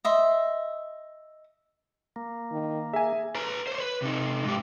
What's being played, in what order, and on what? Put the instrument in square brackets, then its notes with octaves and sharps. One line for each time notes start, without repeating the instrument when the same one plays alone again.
[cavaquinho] D#5 E5 C6
[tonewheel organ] A#3
[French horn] D#3
[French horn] G#4 [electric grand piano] E5 G#5
[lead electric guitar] B4 A#5
C5 C#5
B4
C3 D#4
G#2 G4